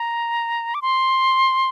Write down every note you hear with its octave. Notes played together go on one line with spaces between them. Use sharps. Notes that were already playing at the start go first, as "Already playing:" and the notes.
Already playing: A#5
D6
C6